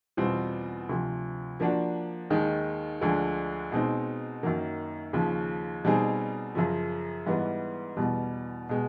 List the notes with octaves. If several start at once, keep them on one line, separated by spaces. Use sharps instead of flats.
E2 B2 G3 C4 F4
D2 C3 F3
F3 A#3 D4 F#4
D#2 D#3 G#3
D2 D3 F3 G#3
B2 G#3 C4 D#4
F#2 D#3 F#3 A#3
D#2 C#3 F3
B2 G3 C4 D#4 G#4
F#2 C#3 F3
G#2 E3 G3 B3
E2 B2 G3
B2 G#3